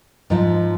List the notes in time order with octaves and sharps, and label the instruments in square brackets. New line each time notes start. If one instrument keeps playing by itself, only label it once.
[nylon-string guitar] G#2 F3